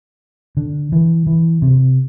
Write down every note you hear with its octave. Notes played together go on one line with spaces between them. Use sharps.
D3
E3
E3
C3